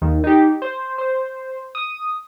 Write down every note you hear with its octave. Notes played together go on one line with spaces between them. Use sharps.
D#2 D#3
D#4 G4
C5
C5
D#6